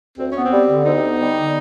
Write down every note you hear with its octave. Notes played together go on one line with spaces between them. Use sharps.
D2 C4
B3 C#4
C4
G3
D3
D2 D#4
B3
G3
D3